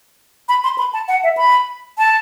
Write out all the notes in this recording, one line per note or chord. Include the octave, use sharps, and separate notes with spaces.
B5
C6
B5
A5
F#5
E5
B5
A5